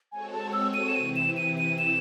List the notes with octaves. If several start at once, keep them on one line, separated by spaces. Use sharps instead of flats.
G#3 C4 F#4 A4 C#5 G#5
A5
E6
D#7
E7
C3 E3 C4 E4 D#7
E7
D#7
D#7
E7